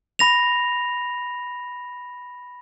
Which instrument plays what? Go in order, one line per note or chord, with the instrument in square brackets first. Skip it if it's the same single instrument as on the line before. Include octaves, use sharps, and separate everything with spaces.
[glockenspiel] B5 A#6 F7